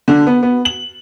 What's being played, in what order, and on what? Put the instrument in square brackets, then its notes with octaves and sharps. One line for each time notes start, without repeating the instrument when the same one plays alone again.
[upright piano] D3
B3
B3
F#7